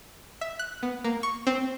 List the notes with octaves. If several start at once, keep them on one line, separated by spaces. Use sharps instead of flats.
E5
F#6
B3
A#3
C#6
C4